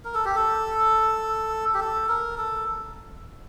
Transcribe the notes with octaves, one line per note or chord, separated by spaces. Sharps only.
A#4
A4
G4
A4
G4
A4
A#4
A4